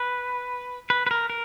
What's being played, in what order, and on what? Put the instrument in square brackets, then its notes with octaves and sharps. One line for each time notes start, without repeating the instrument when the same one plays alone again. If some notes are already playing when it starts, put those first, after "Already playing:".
Already playing: [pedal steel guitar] B4
B4
B4
A#4
A#4